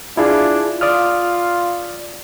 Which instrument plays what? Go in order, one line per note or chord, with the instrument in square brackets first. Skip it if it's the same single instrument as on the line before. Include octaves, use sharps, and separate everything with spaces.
[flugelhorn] D4 [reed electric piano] E4 F4 G#4
[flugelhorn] F4 [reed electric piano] D5 D#6 F6